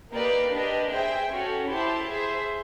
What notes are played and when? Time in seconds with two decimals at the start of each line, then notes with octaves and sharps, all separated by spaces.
0.12 A#3 D#4 G4 B4 D5
0.52 D4 G4 B4 D#5
0.91 G#4 C5 E5 G5
1.30 C#4 F#4 A4 C#5
1.68 E4 G4 C5 E5 A5
2.08 G#4 C5 E5